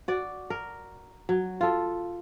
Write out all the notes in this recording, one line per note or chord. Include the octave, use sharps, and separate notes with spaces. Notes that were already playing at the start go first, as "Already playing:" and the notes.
F#4 D5
A#4
F#3
F4 A4